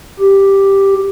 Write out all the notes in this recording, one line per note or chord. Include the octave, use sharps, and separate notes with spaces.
G4